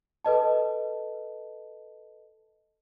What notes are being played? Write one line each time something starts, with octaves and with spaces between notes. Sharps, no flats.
A4 B4 D#5 A5